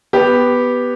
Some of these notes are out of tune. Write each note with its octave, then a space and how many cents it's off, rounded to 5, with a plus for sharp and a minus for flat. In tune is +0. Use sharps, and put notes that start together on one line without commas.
B3 +0 G4 +0